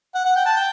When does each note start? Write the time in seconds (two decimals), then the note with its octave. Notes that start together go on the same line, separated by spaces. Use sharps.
0.15 F#5
0.25 F#5
0.36 G5
0.45 A5
0.56 G5